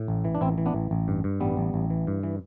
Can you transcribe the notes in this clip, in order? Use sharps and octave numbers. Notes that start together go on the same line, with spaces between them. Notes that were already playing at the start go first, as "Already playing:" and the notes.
Already playing: A2
A1
E3
D4
A1 C4 E4
E3
B3 D4
A1
A1
G2
G2
A1 G3 B3
A1
A1
E3
G2
E3